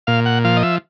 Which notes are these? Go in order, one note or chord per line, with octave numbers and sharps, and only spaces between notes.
A#2 F5
F#5
F3 F5
D#5
E5